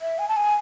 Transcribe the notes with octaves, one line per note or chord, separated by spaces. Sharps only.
E5
G#5
A5
G#5